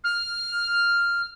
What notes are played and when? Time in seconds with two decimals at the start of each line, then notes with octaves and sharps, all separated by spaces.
0.04 F6